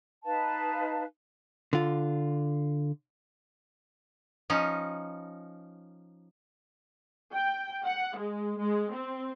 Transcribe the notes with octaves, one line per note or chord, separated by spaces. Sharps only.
D#4 B4 F5 A5
D3 F4
F3 C#4 D#4
G5
F#5
G#3
G#3
C4